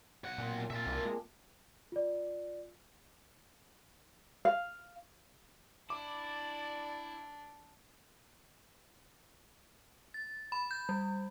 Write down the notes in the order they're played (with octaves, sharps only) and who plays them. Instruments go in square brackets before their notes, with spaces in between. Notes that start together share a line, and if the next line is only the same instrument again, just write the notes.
[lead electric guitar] B1 F#5
[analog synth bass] A#2 [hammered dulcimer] C4 F4
[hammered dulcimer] G#5 A5
[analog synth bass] A#2 [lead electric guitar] F4 E5
[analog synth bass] C2 [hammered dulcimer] A#3 D4
[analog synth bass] G#3
[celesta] F4 D5
[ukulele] F5
[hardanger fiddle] D4 [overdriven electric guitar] E4 [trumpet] D5 [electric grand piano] D6
[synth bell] A6
B5
G6
G3